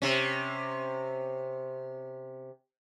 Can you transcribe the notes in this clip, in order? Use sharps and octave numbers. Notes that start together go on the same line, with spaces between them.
C3 C#4